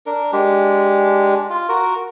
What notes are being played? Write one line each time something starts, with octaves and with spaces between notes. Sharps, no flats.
D4 A#4
G#3 D4 G4
F4
F#4 A#4